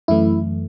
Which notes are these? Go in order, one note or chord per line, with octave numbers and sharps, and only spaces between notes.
F#2 E3 A3 E4